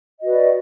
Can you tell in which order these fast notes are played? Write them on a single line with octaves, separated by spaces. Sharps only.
D#5 F#4 B4 D5